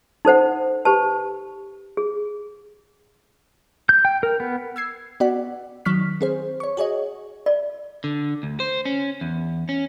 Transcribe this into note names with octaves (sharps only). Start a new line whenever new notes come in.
D#4 A4 C5 F#5
G4 B4 A5
G#4
G6
G5
A#4
B3
E6 G#6 C7
B3 F#4 D5 F#5
D#3 F#3 C#6 F6 B6
C4 G#4 C5
C#5 C#6
F#4 G#4 C#5 D#5
D5
D3
D2
C5
C#4
E2
C#4